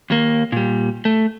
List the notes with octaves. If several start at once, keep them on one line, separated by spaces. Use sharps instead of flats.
D#2 A#3
A#2 G3
A3